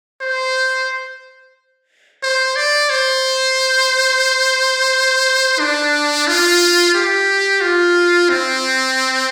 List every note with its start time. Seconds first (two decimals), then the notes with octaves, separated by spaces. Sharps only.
0.21 C5
2.23 C5
2.56 D5
2.90 C5
5.59 D4
6.27 F4
6.94 G4
7.61 F4
8.29 C4